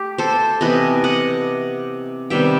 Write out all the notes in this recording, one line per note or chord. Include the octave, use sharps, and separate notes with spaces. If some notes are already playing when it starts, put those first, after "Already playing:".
Already playing: A3 G4
A4 C5
C3 E3 B3 B4 D#5
D#5 F#5
C3 D#3 G3 B3 E5 G5